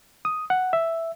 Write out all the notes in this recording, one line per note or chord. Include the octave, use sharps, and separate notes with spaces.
D#6
F#5
E5